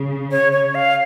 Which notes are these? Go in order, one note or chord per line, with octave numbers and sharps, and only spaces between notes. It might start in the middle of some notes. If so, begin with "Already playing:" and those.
Already playing: C#3
C#5
C#5
F5